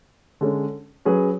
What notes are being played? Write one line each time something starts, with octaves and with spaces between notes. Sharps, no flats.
D3 G#3 C#4
F#3 C#4 G#4 B4